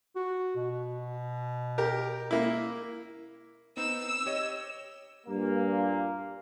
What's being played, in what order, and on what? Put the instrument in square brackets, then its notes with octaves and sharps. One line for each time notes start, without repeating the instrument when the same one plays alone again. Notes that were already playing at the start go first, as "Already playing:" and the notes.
[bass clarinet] F#4
B2
[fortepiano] G4 A#4
A#3 E4
[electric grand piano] B3 C4 D#4 [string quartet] E6
[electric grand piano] G4 C#5 D#5
[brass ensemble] G2 A#2 A#3